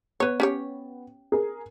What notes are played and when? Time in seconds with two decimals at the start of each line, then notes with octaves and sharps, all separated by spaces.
0.20 B3 B4 C#5
0.40 C#4 G4 C#5
1.32 G#4 A#4